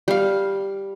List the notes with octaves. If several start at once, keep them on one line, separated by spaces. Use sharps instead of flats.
G3 F5